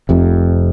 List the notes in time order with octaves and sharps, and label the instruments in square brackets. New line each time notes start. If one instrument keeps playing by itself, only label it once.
[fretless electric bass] F1 F2 C3